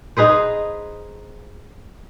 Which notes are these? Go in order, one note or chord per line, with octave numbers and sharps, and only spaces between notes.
D#4 G#4 B4 C5